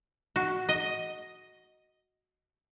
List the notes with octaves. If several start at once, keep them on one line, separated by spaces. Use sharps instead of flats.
F#4
D#5